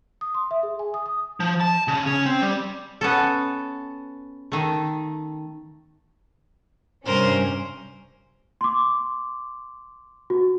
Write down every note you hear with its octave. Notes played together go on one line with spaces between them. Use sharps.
D#6
C6
E5
G#4
G#5
D#6
D#6
F3
A5
C#3
C#4
C4
G3
B3 C#4 A4
D#3 A3
G2 C3 C#4 A#4 C5
C6 D6
F#4